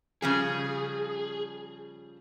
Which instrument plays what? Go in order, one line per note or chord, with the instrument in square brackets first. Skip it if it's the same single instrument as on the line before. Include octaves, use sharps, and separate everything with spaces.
[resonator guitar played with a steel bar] C#3 F3 G3 [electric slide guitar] G#4